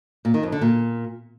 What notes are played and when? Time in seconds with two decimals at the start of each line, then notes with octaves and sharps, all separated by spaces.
0.25 A#2
0.34 D#3
0.43 F2
0.52 D3
0.61 A#2